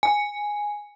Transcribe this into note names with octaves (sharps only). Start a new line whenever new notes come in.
G#5